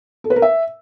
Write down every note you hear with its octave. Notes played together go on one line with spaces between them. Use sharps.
A4
B4
A#4
E5